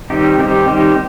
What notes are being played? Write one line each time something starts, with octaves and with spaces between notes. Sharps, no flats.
D#3 G3 C4 D#4 G4
D#3 G3 C4 D#4 G4
D#3 G3 C4 D#4 G4